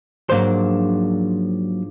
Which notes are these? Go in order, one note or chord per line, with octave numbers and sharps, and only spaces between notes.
G#2 F3 F#3 A#3 D4 C5